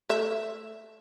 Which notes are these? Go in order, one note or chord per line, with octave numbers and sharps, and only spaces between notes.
A3 E5